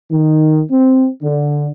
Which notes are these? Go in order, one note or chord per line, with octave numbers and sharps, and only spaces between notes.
D#3
C4
D3